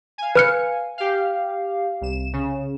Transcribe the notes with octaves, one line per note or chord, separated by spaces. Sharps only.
F5 G#5
B4 F6 C#7
G4 F5
C2 E7
C#3